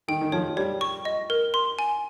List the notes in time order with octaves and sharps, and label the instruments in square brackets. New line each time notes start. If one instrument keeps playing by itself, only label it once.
[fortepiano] D#3 [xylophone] G5
[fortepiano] D#3
[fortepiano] F3 [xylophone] C#5
[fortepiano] G3 [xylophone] C#5
[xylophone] C#6
D#5
A#4
C6
G#5